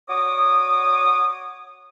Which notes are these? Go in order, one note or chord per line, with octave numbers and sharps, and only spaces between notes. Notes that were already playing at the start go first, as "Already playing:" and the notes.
F#4 C#5 D5 D6 D#6